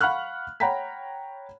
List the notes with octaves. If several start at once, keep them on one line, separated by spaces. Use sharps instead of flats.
F5 F#5 B5 C#6 F6 F#6
C#5 F#5 G5 A#5 B5 B6